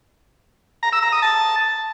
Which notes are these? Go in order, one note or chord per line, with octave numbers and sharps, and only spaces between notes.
A#5
E6
A#5
D#6
A5